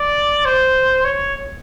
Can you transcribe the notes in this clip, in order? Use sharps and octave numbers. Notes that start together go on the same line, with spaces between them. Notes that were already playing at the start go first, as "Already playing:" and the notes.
Already playing: D5
C5
C#5